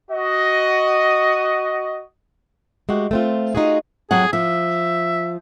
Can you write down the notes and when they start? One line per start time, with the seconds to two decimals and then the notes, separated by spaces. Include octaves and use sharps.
0.11 F#4 D#5
2.89 G#3 A3 F#4 G4
3.11 A3 C4 F4
3.55 D#4 F4 F#4 G#4
4.11 F2 F#3 G#4 F#5
4.33 F3 E5